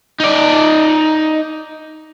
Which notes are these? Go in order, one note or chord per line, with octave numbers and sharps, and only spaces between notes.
D#4 D5